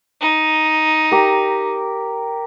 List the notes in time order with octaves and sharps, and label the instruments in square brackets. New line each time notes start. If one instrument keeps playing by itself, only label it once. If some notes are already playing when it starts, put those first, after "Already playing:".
[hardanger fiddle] D#4
[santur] G4 A#4